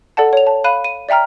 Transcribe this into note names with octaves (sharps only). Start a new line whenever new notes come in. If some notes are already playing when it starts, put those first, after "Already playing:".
A4 D5 F#5 A5
C#5 F7
A5
F5 B5 F#6 D#7 E7
D#7
D5 E5 G5 A#5 F6